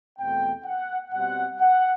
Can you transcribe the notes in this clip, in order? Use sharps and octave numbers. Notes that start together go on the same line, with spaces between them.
E2 B2 A3 C4 G5
F#5
B2 G3 C4 F#5
F#5